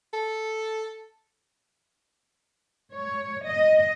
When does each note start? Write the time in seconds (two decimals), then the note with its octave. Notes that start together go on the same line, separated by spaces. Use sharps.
0.13 A4
2.94 C#5
3.46 D#5